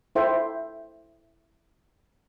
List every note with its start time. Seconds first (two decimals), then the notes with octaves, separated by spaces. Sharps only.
0.15 E4 A4 C5 E5 G5